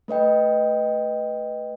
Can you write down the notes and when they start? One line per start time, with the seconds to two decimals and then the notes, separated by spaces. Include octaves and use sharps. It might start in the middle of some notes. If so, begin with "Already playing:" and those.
0.08 A3 B4 D#5 G5